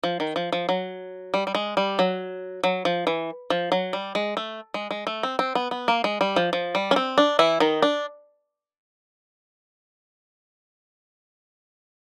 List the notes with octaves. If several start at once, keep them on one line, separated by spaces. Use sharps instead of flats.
F3
D#3
F3
F3
F#3
G3
G3
G#3
G3
F#3
F#3
F3
E3
F3
F#3
G3
G#3
A3
G#3
G#3
A3
C4
C4
B3
B3
A#3
G#3
G3
F3
F3
G3
C#4
C4
D4
E3 E4
D#3 D#4
D4